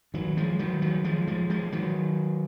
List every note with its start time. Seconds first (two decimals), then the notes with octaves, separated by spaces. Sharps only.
0.14 D#3 F#3
0.37 F3 G#3
0.59 D#3 F#3
0.82 D#3 F#3
1.04 F3 G#3
1.27 F3 G#3
1.50 F3 G#3
1.72 D#3 F#3